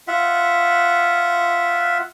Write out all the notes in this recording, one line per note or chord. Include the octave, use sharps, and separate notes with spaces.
F4 E5 F#5